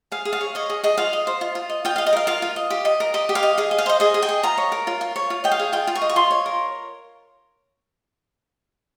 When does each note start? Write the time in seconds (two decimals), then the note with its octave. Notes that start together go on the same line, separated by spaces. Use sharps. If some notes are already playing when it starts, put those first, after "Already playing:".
0.12 G#4 F5
0.25 G#4
0.33 F5
0.41 C#5
0.55 C#5 D#5
0.70 G#4
0.83 G#4 D#5
0.97 F4 F5
1.13 D#5
1.27 C5
1.41 F4
1.55 F4
1.69 D#5
1.85 F4 G5
1.96 D#5 F5
2.06 D#5
2.13 A#4 F5
2.27 F4 F5
2.42 F4
2.56 D#5
2.70 G4
2.85 D#5
3.00 A#4
3.14 G4 D#5
3.29 G4
3.35 F5
3.43 D#5
3.58 G#4 F5
3.71 D#5
3.78 F5
3.86 C5 D#5
4.00 G#4 D#5
4.14 G#4
4.22 G5
4.29 D#5
4.43 F4 A#5
4.58 C#5
4.72 A#4
4.87 F4
5.01 F4
5.16 C#5
5.30 F4
5.44 D#5 G5
5.51 F5
5.59 G#4
5.72 F4 G5
5.87 F4
5.95 C#6
6.01 D#5
6.09 C#6
6.16 F4 C6
6.31 C#5
6.46 A#4